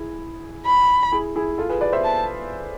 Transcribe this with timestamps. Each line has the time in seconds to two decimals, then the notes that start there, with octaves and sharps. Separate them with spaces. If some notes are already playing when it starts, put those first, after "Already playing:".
Already playing: E4 G#4
0.66 B5
1.12 E4 G#4
1.36 E4 G#4
1.58 F4 A4
1.69 G#4 B4
1.81 B4 D5
1.93 C5 E5
2.04 A5